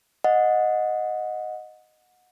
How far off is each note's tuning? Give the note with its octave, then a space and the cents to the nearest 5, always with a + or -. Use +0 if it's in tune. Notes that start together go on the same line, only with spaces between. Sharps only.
D#5 +0 F#5 -20